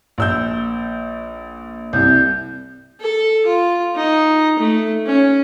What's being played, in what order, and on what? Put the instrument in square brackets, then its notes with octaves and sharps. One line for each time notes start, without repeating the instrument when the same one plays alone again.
[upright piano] A#1 E6 G6
[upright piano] C2 C3 [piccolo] G6
[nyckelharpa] A4
F4
D#4
A3
C#4